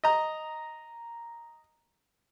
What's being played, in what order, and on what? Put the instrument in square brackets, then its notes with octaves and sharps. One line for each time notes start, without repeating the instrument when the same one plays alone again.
[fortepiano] D#5 A#5